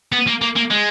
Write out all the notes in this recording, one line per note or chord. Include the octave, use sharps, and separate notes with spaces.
B3
A#3
A#3
A#3
G#3